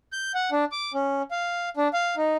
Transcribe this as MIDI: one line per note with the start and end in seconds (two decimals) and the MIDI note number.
0.12 0.32 91
0.34 0.50 78
0.52 0.64 62
0.72 0.92 86
0.94 1.22 61
1.31 1.69 77
1.77 1.88 62
1.93 2.15 77
2.17 2.37 63